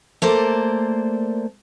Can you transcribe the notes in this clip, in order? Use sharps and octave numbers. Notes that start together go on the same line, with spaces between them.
A3 A#3 C5 D5